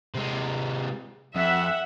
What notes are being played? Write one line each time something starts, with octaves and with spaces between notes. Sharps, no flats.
C3 G#3
F2 E5 F#5